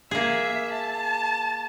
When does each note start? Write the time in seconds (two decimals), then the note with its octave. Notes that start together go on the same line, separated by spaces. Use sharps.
0.11 A#3 G#4 E5
0.72 A5